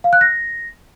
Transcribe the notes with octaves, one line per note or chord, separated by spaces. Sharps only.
F5
F#6
A#6